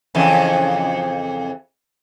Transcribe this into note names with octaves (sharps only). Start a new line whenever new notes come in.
F2 C#3 E3